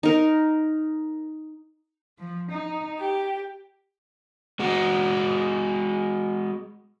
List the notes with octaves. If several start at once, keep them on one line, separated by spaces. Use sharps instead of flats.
D#4 A#4
F3
D#4
G4
G#3 F#4